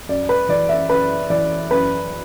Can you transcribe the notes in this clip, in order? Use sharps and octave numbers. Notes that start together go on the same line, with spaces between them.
F#2 D5
B4
E3 D5
E5
F#2 B4
E3 D5
F#2 B4